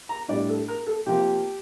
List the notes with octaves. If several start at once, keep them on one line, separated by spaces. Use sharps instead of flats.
A#5
A2 G3 D4 D5
A4
A#4
A4
C3 F3 A#3 G4